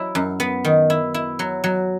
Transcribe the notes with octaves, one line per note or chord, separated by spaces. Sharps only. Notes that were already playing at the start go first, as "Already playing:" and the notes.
Already playing: F#3 E4
F#2
B3
D#3
E4
E4
F#3
F#3